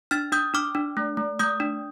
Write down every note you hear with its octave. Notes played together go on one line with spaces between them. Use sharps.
D4 F6 A6
D4 D#6 G6
D4 D6 F6
D4
A3
A3
A3 D#6 G6
D4